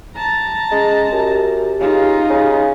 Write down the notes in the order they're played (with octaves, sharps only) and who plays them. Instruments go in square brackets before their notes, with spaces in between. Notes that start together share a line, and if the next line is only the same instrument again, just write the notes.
[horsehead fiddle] A5 A#5
[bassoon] G#3 [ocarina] C#4
[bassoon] F#2 [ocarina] G4
[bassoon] C#3 [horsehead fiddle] D#4 F4
[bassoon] C#3